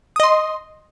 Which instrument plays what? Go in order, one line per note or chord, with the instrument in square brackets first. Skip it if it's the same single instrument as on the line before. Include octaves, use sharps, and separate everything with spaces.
[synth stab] D#6
D#5
C6